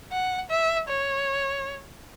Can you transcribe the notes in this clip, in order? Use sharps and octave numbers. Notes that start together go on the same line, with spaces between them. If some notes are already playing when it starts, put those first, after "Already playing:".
F#5
E5
C#5